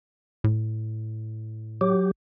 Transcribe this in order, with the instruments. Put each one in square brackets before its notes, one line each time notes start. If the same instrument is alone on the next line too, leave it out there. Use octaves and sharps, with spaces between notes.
[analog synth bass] A2
[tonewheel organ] F#3 G4